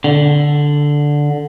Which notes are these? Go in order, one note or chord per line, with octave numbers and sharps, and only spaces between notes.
D3